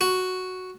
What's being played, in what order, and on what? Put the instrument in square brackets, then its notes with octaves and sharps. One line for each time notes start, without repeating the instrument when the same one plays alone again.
[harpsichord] F#4